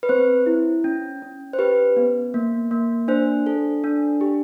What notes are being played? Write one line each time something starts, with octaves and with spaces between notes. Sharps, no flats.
B4
C4 C5
E4
C#4
C#4
C5
G4 B4
B3
A#3
A#3
D4 C5
A4
D4
G4